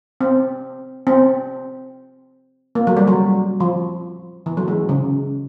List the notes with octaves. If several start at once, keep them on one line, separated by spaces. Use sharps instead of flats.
C4
C4
A#3
F#3
G3
F#3
F3
E3
F#3
G#3
C#3